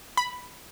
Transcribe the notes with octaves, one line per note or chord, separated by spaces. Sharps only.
B5